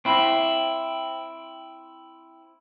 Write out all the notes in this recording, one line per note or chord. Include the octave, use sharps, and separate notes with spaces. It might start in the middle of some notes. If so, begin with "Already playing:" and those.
C4 E4